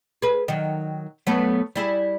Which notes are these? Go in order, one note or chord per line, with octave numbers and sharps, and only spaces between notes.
G#4 B4
D#3 F#3
F#3 A3 B3
G3 E4 G#4